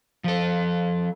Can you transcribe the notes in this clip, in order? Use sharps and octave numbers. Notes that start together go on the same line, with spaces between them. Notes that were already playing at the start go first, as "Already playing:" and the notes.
F3 A4